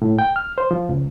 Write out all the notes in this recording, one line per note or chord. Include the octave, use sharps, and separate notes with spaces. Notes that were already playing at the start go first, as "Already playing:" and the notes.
A2
G5
F6
C5
F3
C#2